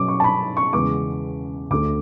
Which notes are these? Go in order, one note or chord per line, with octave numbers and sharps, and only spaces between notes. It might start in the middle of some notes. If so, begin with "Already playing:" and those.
Already playing: B2 F#3 C#4 D6
C#6
A5
B5
C#6
E2 C#3 G#3 B3 D6
D2 D3 A3 D6